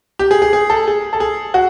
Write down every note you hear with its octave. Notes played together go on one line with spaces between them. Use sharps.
G4
G#4
G#4
G#4
A4
G#4
A4
G#4
F#4